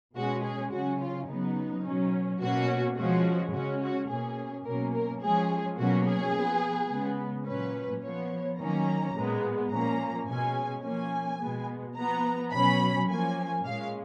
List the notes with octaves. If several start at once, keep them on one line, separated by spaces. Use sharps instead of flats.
B2 G#3 C#4 F#4
G#4
C#3 F#3 C#4 F#4
F4
C#3 F#3 B3 D#4
B2 F#3 C#4
B2 A#3 C#4 F#4
F3 G#3 C#4 F#4
C#3 G#3 C#4 F#4
F#4
B2 A#3 C#4 G#4
B2 F#3 A#3 C#4 A#4
A#4
F3 G#3 C#4 G#4
B2 F#3 A#3 C#4 F#4
G#4
F3 B3
C#3 G#3 B3
A#2 F#3 C#4 B4
F3 B3 C#5
D#3 F#3 A#3 C#4 A#5
A#2 G#3 B3
A#2 F3 A#3 C#4 A#5
B2 G#3 C#4 G#5
F3 A#3 C#4 G#5
B2 G#3 B3
F3 B3 A#5
B2 F#3 C#4 B5
F3 A#3 C#4 G#5
A#2 G#3 C#4 F5